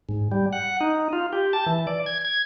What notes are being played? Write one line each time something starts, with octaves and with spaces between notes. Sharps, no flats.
G#2
G3
F#5
D#4
F4
G4
A5
E3
D5
G#6
G#6